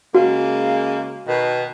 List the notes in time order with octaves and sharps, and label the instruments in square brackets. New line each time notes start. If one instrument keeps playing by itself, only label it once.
[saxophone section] C#3 G#3 A#3 [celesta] F#4
[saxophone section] B2 D#3